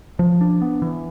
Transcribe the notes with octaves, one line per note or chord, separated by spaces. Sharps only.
F3
D4
B3
E3